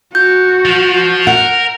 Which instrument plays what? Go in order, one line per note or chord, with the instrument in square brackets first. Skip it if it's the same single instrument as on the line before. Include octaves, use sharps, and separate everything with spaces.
[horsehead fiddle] F#4 [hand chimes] G6
[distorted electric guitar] F3
[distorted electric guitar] A#4 [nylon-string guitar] F#5